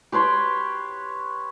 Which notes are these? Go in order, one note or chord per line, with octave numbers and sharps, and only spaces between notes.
G4 B4 C#5 C6